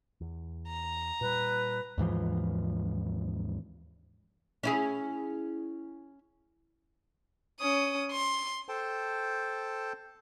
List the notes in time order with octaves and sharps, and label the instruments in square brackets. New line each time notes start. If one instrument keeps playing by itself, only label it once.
[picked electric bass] E2
[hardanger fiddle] A#5
[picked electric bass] A#2 G3 [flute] B4
[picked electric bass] D#2 G#2 E3 F3
[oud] C#4 E4 G#4
[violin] C#4 D#6
C6
[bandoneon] A4 C5 G5 A5